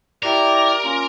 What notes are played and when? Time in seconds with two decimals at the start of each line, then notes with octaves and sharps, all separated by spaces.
0.23 E4 G4 A#4 D5
0.84 A#3 C#4 F4